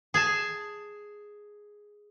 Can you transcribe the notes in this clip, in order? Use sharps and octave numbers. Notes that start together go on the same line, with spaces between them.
G#4 G#5 A5